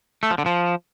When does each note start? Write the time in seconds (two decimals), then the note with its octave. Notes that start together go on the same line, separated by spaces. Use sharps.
0.23 A3
0.30 F3
0.38 D3
0.46 F3